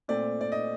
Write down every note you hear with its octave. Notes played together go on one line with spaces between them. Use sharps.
A#2 A3 C4 D5
D5
D#5